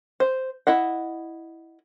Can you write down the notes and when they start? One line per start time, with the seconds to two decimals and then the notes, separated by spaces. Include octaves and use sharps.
0.20 C5
0.67 E4 D#5 F#5